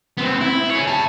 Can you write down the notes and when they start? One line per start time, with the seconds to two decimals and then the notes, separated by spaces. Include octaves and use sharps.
0.17 B3 C4
0.40 E4
0.70 G#4 C#5
0.87 G5 A5